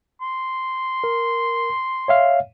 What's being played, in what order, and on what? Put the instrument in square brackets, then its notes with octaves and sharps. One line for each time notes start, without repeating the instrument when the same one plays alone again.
[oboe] C6
[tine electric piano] A#4
C#5 E5 F5